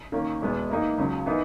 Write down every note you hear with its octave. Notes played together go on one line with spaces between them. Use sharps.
D#3 A#3 C#4
E2 B2 G#3 B3
E3 A#3 D#4
C#2 C#3 F#3
E3 B3 D#4 A#4